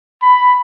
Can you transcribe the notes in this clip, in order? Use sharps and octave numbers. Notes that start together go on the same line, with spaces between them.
B5